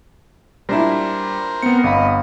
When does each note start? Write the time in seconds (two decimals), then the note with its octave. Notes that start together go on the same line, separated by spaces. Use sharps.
0.69 A#2 G3 D4 E4 A#4 C5
1.62 B3 C4 C#7
1.84 G1 D#5 F5 B5